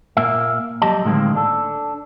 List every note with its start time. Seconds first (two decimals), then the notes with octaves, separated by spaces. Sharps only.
0.17 A#2 A#3 E5
0.82 F#3 G3 G4 D#5 A5
1.05 A2 D3 D#3 G#3 A#3 C4
1.35 D4 A4